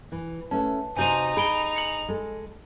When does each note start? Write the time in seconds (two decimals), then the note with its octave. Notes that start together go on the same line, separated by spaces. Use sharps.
0.12 E3
0.51 A3 C#4 B4 A5
0.97 C3 D#4 F#4 C5 G#5 G6 D#7 F7
1.37 G#4 B5 D7 G7
1.76 C#7 F#7
2.08 G#3 A4